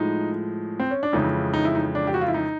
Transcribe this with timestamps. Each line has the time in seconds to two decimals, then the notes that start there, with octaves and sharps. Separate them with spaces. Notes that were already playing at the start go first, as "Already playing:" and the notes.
Already playing: A2 F3 G#3 D#4
0.80 C4
0.91 C#4
1.03 D4
1.13 F2 C#3 E3 G#3 D#4
1.54 D#4
1.65 E4
1.75 D#4
1.95 D4
2.07 G4
2.14 F#4
2.21 F4
2.28 E4
2.34 D#4